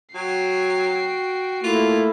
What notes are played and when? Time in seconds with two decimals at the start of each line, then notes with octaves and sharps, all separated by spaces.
0.15 F#3 F#4 G5 C7
1.64 A3 A#3 E4 F4